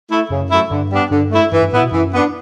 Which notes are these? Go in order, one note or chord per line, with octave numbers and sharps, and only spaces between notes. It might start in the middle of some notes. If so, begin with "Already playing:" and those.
A3 E4
F#2 C#3
F#3 A3 E4
G2 D3
G3 B3 D4
G2 D3
A3 E4
G2 E3
G2
A2 B3 E4
B2
F#2 E3
B3 D4